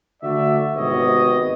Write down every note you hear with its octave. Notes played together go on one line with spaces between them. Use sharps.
D3 A3 F#4 D5 E5
G#1 C3 B3 G4 C#5 D#5